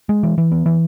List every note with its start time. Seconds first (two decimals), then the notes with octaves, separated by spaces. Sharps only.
0.09 G#3
0.23 E3
0.38 E3
0.52 B3
0.66 E3